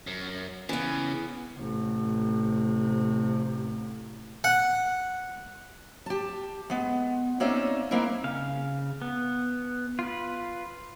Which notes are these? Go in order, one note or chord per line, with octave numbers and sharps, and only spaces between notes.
F#2
C#3 E3 B3
A1 C3
F#5
G4 A5
G#3 B3
A#3 C4 C#4 D#4 D5 E5
G#3 A#3 C4 D#4 E4 A#4
C#3 F5
B3
F4 B4